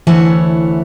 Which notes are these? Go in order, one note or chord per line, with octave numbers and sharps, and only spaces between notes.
D2 E3 E4 C#5 A5